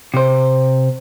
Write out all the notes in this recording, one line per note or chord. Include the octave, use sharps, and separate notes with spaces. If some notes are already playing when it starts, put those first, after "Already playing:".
C3 C5